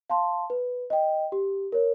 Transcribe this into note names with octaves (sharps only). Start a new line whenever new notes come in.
F5 A5 C6
B4
D#5 G5
G4
A#4 C#5